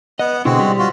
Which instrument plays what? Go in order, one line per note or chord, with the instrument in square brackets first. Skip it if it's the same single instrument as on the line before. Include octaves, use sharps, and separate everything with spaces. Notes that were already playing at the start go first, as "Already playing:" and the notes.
[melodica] B3 F#5 [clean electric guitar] D#5
[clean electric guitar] B2 D3 E4 [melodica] G#3 C4 F#4
[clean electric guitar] G3
[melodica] F4 F#4